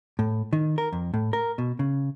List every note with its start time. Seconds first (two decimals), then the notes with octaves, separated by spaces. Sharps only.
0.19 A2
0.53 D#3
0.78 A#4
0.93 F2
1.14 A2
1.33 A#4
1.58 B2
1.79 C#3